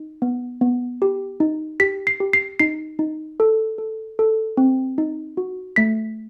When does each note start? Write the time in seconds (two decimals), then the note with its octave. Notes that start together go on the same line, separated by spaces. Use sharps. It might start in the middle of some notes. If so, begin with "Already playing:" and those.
Already playing: D#4
0.22 B3
0.61 B3
1.02 G4
1.40 D#4
1.80 G4 B6
2.07 C7
2.20 G4
2.33 C7
2.59 D#4 C7
2.99 D#4
3.40 A4
3.78 A4
4.19 A4
4.57 C4
4.98 D#4
5.37 F#4
5.76 A3 B6